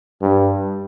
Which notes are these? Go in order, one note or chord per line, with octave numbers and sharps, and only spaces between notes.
G2